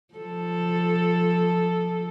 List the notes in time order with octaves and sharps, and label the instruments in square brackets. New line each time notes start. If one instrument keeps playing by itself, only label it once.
[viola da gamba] F3 A4